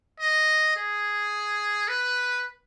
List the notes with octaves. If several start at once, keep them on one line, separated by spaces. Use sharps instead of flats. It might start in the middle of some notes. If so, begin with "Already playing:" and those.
D#5
G#4
B4